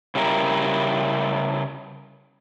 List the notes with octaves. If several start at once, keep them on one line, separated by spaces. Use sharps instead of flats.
C#3 G3 E4 A#4